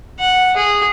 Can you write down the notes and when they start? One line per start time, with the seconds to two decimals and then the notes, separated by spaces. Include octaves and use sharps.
0.20 F#5
0.56 G#4